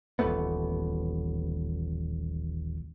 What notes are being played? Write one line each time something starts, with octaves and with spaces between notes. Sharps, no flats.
D#1 A1 A3 B3